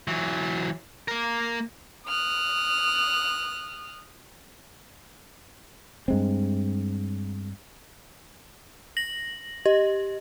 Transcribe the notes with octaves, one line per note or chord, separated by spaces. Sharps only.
E3 F#3
A#3 A#4
D#6 F6 F#6
G2 G#3 C4
A#6 F#7
G4 D#5